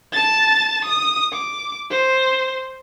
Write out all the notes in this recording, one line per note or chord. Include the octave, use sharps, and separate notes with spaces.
A5 A6
D#6
D6
C5